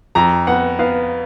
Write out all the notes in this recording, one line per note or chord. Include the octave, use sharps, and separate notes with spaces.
F2 A#5
B3 F#5
B3 F5